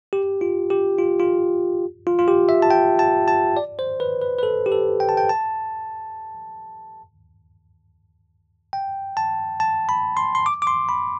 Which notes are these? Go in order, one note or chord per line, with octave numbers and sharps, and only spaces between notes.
G4
F4
G4
F4
F4
F4
F4
G4
E5
A5
G5
A5
A5
D5
C5
B4
B4
B4
A4
G4
A4
G5
A5
G5
A5
G5
A5
A5
B5
C6
C6
D6
D6
C6
B5